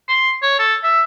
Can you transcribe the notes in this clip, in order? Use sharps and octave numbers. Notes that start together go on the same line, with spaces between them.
C6
C#5
A4
E5